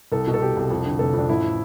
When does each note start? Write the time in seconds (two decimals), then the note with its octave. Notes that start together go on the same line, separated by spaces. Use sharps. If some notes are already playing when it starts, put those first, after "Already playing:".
0.12 C2 A4
0.27 B2
0.34 A4
0.42 B2 G4
0.57 C2
0.71 F2
0.85 D3
0.99 F1 A4
1.14 F2 D4
1.29 A1 E4